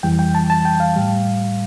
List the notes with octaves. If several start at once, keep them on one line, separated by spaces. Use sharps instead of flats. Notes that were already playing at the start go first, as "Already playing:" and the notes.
F2 E3 G3 G5
G5
A5
A5
G5
F5
A2 G3